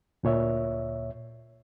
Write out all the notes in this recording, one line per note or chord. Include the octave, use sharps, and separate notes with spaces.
D2 A#2 C#5 E5